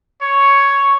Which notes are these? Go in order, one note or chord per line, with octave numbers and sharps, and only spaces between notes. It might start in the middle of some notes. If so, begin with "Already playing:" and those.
C#5